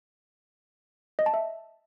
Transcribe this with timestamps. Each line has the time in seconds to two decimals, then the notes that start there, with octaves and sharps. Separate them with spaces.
1.19 D#5
1.26 A5
1.34 E5